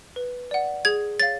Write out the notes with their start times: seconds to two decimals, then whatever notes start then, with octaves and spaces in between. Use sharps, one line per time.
0.16 B4
0.51 D5 F#5
0.85 G#4 G#6
1.20 C#5 F5 A6